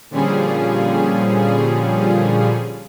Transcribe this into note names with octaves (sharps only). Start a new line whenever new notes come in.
A#2 D3 F3 G3 C#4 G#4